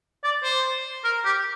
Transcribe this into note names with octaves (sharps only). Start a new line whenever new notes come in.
D5
C5
A#4
G4